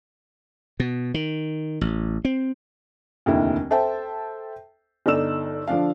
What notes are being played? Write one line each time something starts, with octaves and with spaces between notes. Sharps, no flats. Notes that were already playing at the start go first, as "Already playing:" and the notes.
B2
D#3
A1
C4
F1 D#2 D3 E4
A4 C5 E5 G5 A5
G1 D#4 A4 D5 E6 E7
D3 F3 D4 F5